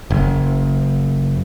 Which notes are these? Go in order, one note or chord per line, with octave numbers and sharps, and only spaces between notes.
F#1